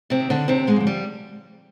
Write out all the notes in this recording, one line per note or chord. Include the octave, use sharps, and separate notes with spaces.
C3 C4
D#3
D3 D4
D#2 C3 C4
G#2 G#3
D3 F3
G3